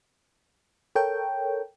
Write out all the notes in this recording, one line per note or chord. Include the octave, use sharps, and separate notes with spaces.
A4 A#4 C#5 G5